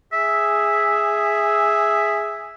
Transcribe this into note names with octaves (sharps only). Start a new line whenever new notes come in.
G#4 E5